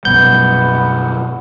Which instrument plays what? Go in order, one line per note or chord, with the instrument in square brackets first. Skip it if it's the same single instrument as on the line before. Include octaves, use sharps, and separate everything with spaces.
[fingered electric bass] F#2 B2 G3 [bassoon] B3 [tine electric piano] G6